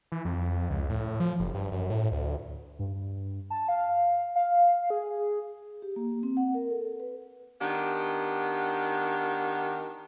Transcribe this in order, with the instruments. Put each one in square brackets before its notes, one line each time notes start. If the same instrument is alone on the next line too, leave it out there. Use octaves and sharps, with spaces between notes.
[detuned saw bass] E3
F2
C#2
A2
F3
F#1
G2
F#2
A2
D2
[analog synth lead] G2
A5
F5
F5
G#4
[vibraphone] G4
A#3
C4
F#5
A#4
A4
B4
[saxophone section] D#3 B3 D4 G4